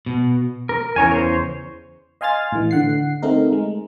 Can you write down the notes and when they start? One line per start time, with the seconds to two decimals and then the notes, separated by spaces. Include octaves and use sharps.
0.06 B2
0.69 A#4
0.96 E2 C#3 E3 A#4 C#5 G#5
1.11 C5 C#5
2.21 D#5 F5 G#5 C6 F6 A6
2.52 A2 E3
2.71 D3 F#5 C7
3.22 A3 C4 D#4 A#4
3.52 G#3